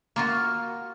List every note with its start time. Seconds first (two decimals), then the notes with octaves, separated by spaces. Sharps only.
0.16 A#3 F4 F#4